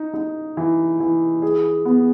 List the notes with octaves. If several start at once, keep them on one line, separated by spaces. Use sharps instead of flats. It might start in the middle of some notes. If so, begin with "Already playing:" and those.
Already playing: D#4
D#4
E3
E3
G#4
B3